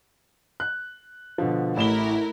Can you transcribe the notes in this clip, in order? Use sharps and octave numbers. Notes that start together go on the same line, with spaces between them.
F#6
B2 D3 F3
A1 A3 E4 A#4 E7 G7